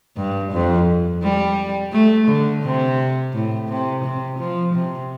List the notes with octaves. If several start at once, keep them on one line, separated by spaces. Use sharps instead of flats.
G2
F2
G3
A3
D3
C3
A2
C3
C3
F3
C3